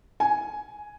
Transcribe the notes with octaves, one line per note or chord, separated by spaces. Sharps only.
G#5